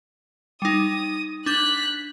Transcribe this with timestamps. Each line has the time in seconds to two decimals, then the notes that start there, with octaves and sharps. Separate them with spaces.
0.62 G3 D#4 D#6
1.46 D4 F#6 G6 B6